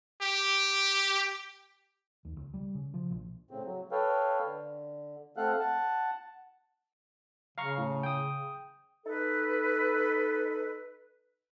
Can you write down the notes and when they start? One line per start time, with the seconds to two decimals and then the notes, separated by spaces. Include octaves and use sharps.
0.22 G4
2.25 D#2
2.37 C#2
2.54 G3
2.75 C#3
2.94 F3
3.10 A#1
3.51 A2 C#3 C4
3.65 F#3
3.92 A4 B4 C#5 F5 G5
4.44 D3
5.37 A3 C4 A4 F5 F#5 F#6
5.60 F#5 A5
7.58 C#3 F5 A#5 C#6
7.78 A2
8.03 G5 D#6
9.06 D#4 A4 B4